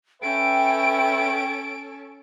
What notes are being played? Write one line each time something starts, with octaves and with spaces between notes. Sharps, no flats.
C#4 A4 B4 E5 G5 D7